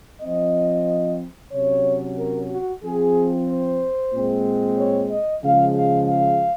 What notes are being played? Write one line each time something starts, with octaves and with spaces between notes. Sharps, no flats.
F3 C4 D#5
C3 F#3 C#4 C#5
A#4
F#4
F3 C4 G#4
C5
A#2 G#3 C4
C#5
D#5
C#3 F3 G#3 F5
F5
F5